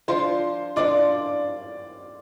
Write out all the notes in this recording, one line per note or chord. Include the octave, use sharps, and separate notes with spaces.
F3 D4 F4 C5 C6
F3 D4 F4 D5 D6